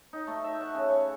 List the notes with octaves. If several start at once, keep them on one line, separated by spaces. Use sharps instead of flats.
D#4
A3
E5
F#5
C#3
C#5